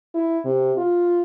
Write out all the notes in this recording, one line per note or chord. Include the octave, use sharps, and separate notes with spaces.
E4
C3
F4